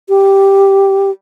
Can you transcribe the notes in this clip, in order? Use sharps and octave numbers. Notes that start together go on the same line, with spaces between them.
G4